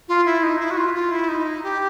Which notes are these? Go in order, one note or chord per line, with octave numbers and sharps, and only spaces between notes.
F4
E4
D#4
E4
F#4
F4
F4
E4
D#4
G4